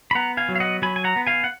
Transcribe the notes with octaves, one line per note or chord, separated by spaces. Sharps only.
B5
B3 F#5 A#5
F5 G#5
F#3
F5
D#5 F#5
F#3 G#5 B5
G#5
F#5 A#5
B3
F5 G#5
F#5